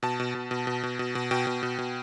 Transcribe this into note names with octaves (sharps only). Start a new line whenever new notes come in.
B2 A5
B2
B2
B2
B2
B2
B2
B2
B2 G5
B2
B2
B2